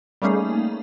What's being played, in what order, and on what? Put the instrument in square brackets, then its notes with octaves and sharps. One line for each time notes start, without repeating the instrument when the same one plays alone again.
[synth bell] G3 A3 A#3 C#4 D#4 G#4